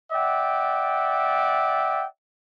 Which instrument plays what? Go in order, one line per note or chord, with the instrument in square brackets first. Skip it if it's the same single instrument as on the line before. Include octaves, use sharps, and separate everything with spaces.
[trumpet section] D5 E5 F#5 G5